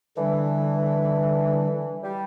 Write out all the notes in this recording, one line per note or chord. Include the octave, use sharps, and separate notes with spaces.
D3 E3 G3 D4
G3